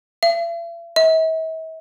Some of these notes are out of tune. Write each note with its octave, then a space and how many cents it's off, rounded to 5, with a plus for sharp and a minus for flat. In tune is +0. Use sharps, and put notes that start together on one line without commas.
E5 +45
E5 -45